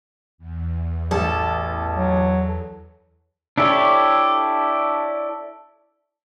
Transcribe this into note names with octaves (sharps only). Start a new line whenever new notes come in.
E2
A1 A4
F#3
D4 E4 G4 A4 C#5